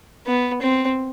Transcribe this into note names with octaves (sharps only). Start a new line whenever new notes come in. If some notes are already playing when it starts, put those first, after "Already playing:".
B3
C4